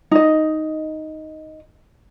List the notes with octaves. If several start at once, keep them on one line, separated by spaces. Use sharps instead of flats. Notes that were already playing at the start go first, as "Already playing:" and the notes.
D#4 D#5